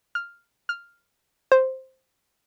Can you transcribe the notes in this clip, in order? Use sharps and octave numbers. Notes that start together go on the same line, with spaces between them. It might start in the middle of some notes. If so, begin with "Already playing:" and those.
F6
F6
C5